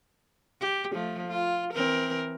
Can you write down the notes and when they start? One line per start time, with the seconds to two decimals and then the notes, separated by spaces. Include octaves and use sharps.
0.61 G4
0.92 F3 A3
1.28 F4
1.74 E3 C4 A#4